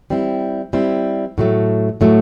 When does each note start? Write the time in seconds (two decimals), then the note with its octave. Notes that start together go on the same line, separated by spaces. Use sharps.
0.10 G3 C4 E4
0.73 G3 C4 E4
1.38 A2 F#3 A3
2.01 A2 F#3 A3